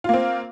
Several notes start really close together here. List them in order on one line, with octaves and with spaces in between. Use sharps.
F4 A#3 C4